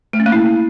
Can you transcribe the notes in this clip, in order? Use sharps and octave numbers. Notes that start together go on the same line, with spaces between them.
A3
C#4
A#3
E4